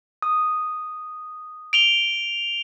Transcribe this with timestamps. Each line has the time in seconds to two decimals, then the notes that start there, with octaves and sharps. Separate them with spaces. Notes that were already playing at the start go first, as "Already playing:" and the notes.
0.22 D#6
1.73 D7 F7 G7